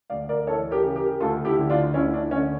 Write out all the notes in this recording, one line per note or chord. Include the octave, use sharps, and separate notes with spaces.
D2 D5 F5
A#4 D5
E3 A4 C#5
G4 A#4
C#3
G4 A#4
D2 F4 A4
E4 G4
D3
D4 F4
D2 C#4 E4
D4
D3 C#4